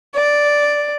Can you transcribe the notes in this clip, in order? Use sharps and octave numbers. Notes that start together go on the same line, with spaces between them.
D5